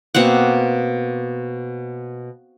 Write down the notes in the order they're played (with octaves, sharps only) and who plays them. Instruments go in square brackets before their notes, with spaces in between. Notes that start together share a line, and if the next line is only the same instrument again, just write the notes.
[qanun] B2 A#3 C4 F#5